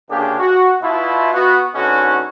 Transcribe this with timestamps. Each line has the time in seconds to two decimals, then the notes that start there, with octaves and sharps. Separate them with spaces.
0.11 D2 C#3 A#3 D4 G4 G#4
0.40 F#4
0.82 B2 E4 F4
1.34 B3 F#4
1.75 G#2 D3 B3 C#4 D#4 F#4